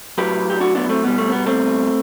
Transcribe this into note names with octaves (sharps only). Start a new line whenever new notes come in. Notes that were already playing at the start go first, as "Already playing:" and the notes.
A2 F#3 G4 B4
G4
D4 F#4
B3 D4
A3 C4
B2 G3 B3
A3
C4
B3
A3 C4